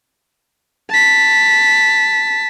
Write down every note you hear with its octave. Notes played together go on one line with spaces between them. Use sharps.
A5 B6